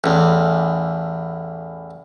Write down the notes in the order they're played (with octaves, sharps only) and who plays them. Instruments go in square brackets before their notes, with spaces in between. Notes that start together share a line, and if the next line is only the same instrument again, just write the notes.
[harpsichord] A1 E2